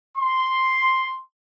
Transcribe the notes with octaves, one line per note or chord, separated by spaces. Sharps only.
C6